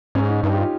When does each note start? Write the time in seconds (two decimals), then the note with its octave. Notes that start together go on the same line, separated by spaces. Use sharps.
0.15 G#2 C#4
0.30 D#4
0.43 G2 D#4
0.54 G4
0.57 F4